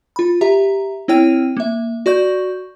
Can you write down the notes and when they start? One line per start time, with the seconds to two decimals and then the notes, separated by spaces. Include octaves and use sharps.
0.16 F4 B5
0.41 G4 E5 A#5
1.08 C4 E4 C#5 G5 F6 D#7
1.57 A#3 E5
2.06 F#4 D5 C#6 G6